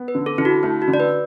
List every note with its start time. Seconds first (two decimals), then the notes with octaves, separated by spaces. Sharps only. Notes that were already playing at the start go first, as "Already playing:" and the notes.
Already playing: B3
0.08 B4
0.15 D3
0.26 A4
0.38 D3 E4
0.45 F#4
0.63 A3 E4
0.82 F#4
0.88 D3
0.94 D5
1.00 B4